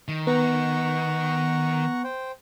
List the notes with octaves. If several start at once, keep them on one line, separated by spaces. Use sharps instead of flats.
D#3
B3 F#5 A#5 C#6
C5 G5